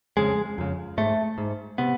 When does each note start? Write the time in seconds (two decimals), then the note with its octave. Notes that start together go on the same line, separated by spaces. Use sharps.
0.17 F2 C#3 G#3
0.58 F2 C#3
0.98 G#2 A3
1.38 G#2
1.78 C3 B3